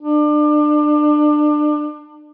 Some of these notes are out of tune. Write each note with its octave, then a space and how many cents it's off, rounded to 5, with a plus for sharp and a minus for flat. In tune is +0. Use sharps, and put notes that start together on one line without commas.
D4 +30